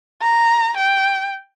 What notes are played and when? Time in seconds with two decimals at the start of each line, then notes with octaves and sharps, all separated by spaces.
0.21 A#5
0.77 G5